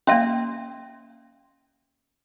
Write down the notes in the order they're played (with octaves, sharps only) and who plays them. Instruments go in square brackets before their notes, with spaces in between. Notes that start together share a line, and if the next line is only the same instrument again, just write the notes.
[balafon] A#3 F5 C6 [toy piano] C#4 E5